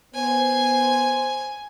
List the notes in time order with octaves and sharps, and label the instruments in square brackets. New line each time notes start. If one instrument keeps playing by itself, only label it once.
[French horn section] B3 C5 [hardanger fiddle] G#5